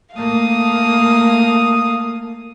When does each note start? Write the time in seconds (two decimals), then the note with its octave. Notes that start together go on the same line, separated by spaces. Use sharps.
0.15 A3 A#3 F5 D#6